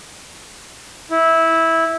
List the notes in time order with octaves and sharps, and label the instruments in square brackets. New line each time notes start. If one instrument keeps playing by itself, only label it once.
[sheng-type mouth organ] E4